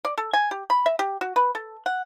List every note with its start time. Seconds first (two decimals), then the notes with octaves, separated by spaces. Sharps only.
0.05 D5
0.18 A4
0.33 G#5
0.51 G4
0.70 B5
0.86 E5
0.99 G4
1.21 F#4
1.36 B4
1.55 A4
1.86 F#5